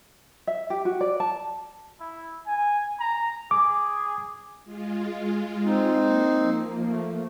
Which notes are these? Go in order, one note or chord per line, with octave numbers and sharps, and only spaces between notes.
E5
G4
F#4
D5
A5
E4
G#5
A#5
G#4 D6
G#3 F4
C4 D#4
A#3 C7
F3 A#3
A3